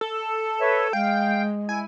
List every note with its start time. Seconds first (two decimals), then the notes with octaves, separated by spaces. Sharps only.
0.01 A4
0.61 B4 C#5 E5
0.93 G#3 F5 G5
1.69 E4 G#5